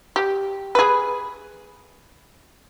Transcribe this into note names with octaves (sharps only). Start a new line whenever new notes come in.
G4
G#4 B4